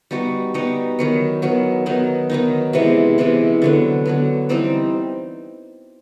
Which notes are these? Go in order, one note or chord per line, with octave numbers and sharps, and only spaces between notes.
G3 B3 D#4 F#4
G3 B3 D#4 F#4
D#3 F#3 B3
D#3 F#3 B3
D#3 F#3 B3 D#4
D#3 F#3 B3 D#4
C3 E3 G#3 B3
C3 E3 G#3 B3
D3 F#3 B3
D3 F#3 B3
E3 G3 C4 D#4